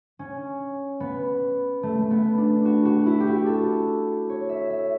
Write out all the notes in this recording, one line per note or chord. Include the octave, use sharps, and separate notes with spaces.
C#4
B3
A3
A3
B3
D4
F#4
F#4
E4
G4
F#4
A4
C#5
E5
E5